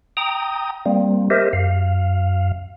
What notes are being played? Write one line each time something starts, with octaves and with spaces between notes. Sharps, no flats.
G5 A#5 D#6
G3 A#3 C4
G4 A#4 C5 D#5 E5
F#2 F5